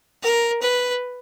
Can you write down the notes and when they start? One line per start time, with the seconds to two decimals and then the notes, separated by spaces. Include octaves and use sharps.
0.22 A#4
0.63 B4